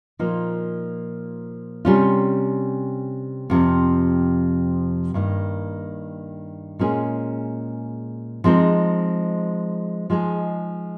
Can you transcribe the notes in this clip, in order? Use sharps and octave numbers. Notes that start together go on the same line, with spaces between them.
A#2 F3 A#3 D#4
C3 G3 C#4 F4
F2 C3 F3
G2 D#3 A#3
A#2 G#3 C#4 G#4
F3 G#3 C4 D#4
F3 G#3 D#4 G#4